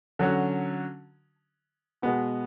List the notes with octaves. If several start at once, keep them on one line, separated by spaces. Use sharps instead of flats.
D3 F#3 C#4 F#4
B2 G#3 B3 F#4